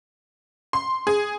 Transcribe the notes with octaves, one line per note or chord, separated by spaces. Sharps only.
C6
G#4